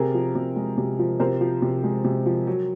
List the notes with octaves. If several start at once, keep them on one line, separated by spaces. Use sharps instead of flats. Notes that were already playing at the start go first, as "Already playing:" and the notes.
Already playing: C3 G#4 A#4
F3
C3
G#3
C3
F3
C3 A#4 C5
F3
C3
G#3
C3
F3
F#3